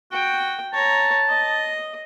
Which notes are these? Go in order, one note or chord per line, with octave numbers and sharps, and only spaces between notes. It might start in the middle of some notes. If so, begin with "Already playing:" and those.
F#4 G5
C#5 A5 A#5
D#5